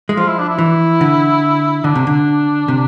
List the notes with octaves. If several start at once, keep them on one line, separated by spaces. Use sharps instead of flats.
G#3
F3 F4
E4
D4
E4
E3
D3
D3 D4
C3
D3
C3